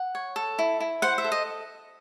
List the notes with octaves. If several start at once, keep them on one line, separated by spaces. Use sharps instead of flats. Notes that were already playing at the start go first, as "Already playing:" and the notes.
Already playing: F#5
C#5
A4
E4
E4
C5 F#5
E5
A4
D#5